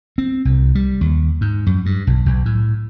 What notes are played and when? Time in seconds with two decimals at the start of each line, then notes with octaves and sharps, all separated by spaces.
0.18 C4
0.45 C2
0.75 G3
1.01 D#2
1.41 G#2
1.67 F#2
1.86 G2
2.07 B1
2.26 B1
2.46 A2